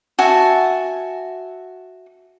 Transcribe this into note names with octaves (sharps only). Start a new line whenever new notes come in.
F#4 E5 G#5 A5